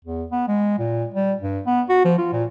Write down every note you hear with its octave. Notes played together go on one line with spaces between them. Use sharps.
E2
B3
G#3
A#2
G3
G2
B3
F#4
F3
F4
A#2